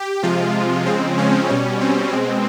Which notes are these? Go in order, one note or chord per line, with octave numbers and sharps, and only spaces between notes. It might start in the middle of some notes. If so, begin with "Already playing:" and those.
Already playing: G4
C3 F3 G#3 F4
C#3 F3 G#3 C4
C#4
B2 G3 C#4
C4
B2 G#3